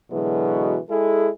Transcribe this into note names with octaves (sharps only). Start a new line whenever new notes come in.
B2 D3 E3 F#3 G#3
G#3 E4 G#4 A4